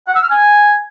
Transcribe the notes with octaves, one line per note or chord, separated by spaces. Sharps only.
F#5
E6
F6
G#5